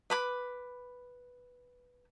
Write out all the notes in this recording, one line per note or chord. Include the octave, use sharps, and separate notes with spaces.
B4 B5 D6